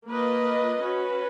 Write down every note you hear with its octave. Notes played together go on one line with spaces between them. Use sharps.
A#3 F4 B4 D#5
C#4 F#4 B4